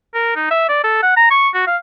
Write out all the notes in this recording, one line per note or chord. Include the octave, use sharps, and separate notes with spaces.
A#4
D#4
E5
D5
A4
F#5
A#5
C#6
F#4
F5